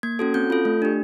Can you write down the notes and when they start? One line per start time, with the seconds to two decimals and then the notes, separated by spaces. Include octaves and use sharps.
0.03 A#3 G#6
0.19 C#4 F#4 A4
0.34 C4 G6
0.50 F4 A4
0.65 A3
0.82 D4 G4